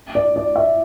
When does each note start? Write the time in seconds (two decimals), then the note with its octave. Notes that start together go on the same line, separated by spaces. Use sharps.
0.15 D5
0.36 D5
0.56 E5